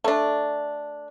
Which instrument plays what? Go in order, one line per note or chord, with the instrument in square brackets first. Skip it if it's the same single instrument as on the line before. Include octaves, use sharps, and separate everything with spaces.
[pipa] A3 D4